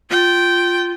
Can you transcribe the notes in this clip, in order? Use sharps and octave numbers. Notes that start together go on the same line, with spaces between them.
F4 G5